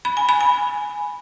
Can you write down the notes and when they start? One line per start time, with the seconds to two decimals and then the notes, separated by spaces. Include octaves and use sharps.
0.05 B5
0.17 G#5
0.29 B5
0.41 G#5